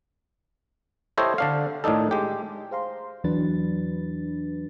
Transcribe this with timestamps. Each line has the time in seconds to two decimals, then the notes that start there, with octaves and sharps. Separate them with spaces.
1.18 E4 G4 A4 C5 C#5 D#5
1.38 D3 D4 F5
1.84 A2 D#3 D4 D#4 A4
2.11 G#3 G4
2.71 G#4 C5 F5 A#5 C6
3.24 E2 E3 F#3 D4 B4 A6